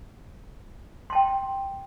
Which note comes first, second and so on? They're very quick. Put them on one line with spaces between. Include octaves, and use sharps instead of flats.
C6 A5 G5